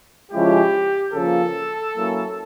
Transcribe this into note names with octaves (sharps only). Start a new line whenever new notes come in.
C#3 F3 G#3 C#4 E4 G4
C#3 F3 A#3 A4
F#3 A#3 C#4 E4